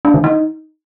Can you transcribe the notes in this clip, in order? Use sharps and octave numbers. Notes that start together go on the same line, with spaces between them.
D4
D#3
D#4